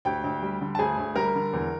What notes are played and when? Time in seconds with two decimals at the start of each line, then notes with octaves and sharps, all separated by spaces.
0.05 D2 G4 G5
0.24 D2
0.42 G3
0.61 D3
0.75 A5
0.79 D2 G#4 G#5
0.97 D2
1.16 G3 A#4 A#5
1.35 D3
1.53 E2